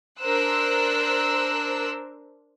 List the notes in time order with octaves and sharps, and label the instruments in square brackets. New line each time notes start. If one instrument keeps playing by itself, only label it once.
[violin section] D4 A#4 C5 E6 F#6